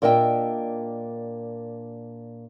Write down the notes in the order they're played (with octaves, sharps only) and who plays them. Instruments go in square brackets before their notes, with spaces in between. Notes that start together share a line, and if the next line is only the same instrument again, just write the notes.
[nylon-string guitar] A#2 D4 A#4 D#5 E5 G5